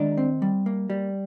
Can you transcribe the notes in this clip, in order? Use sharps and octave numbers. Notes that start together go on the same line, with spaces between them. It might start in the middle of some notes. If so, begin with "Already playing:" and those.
Already playing: D#3 G#3 D4 D5
C4
G3
A#3
G3